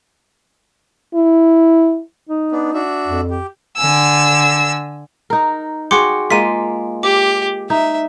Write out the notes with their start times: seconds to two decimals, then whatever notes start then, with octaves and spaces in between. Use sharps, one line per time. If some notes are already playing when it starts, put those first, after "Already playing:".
1.15 E4
2.29 D#4
2.52 B3 D4
2.74 D4 F#4 E5
3.07 F2
3.30 G4
3.77 D3 G#5 E6
5.30 D#4 A#4
5.91 F#4 G#4 G5 C6 D6 C#7
6.30 G#3 A#3 F4 B6 D#7
7.03 G4 D6
7.70 D#4 E5